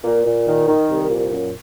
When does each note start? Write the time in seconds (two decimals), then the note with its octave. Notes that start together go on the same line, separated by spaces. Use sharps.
0.04 A#2
0.25 A#2
0.47 D#3
0.68 D#3
0.89 C2
1.10 A#2
1.31 F#2